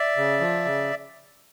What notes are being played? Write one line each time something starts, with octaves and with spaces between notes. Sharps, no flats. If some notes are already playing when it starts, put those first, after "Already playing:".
Already playing: D5 E5
C#3
F3
C#3